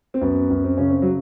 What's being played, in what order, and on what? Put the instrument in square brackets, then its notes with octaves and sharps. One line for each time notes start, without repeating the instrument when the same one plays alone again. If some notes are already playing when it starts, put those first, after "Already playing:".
[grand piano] C4
F#2 B3
F#2
C4
C#3 C#4
C4
F#3